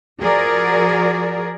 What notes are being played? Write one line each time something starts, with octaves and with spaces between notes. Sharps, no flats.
F3 F#4 G#4 A#4 D5